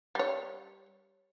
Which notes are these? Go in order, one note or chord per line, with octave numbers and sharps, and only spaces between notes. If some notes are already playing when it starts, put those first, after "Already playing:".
G3 C#5